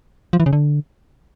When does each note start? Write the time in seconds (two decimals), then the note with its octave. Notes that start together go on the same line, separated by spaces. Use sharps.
0.33 F3
0.40 E3
0.46 C#3
0.53 D3